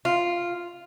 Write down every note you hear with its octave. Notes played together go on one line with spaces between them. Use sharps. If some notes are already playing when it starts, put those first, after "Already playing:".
F4